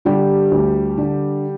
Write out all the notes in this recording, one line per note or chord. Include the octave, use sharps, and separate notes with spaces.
D3 G3 G4
D2
D3